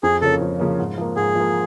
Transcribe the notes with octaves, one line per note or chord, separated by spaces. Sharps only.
F2 G#4
C#3 F3 A#3 C#4 A4
F2
C#3 F3 A#3 C#4
G#2
F3 A#3
G#2 G#4
F3 A#3